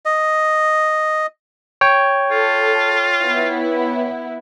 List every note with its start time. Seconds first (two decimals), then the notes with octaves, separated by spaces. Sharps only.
0.05 D#5
1.81 C#5 G5
2.31 F4 A4
3.23 B3 E4